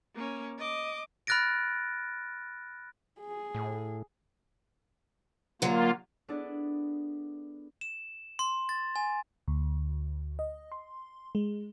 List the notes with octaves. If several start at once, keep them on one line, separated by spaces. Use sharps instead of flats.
A#3 C#4
D#5 D6
B5 F6 F#6 A6 A#6 D7
G#4
A2
D3 F#3 A#3 F4
B3 D4 E4 G#4 A4 D5
E7
C6
A6
G#5
D2
D#5
C6
G#3